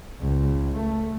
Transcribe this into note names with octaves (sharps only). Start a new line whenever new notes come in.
C#2
A3